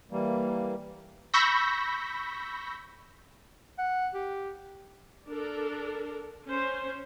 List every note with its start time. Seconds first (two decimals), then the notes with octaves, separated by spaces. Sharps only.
0.11 E3 G3 A#3
1.34 B5 C#6 E6 G6 A#6 B6
3.78 F#5
4.14 G4
5.29 D4 A4 A#4
6.46 C#4 C5